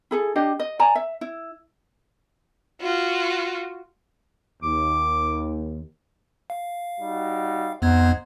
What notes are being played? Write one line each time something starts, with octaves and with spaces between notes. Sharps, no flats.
E4 G#4 A4
D4 G4 D#5
D#5
D5 G#5 A#5
E5
E4
F4 F#4
D#2 D6
F5
G3 D#4 F#4
F2 B3 D#4 C5 F#5 G#6